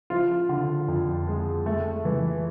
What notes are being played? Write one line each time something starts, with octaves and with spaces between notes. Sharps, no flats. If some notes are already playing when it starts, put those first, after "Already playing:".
F3 F4
D3
F2
G#3
A3
E3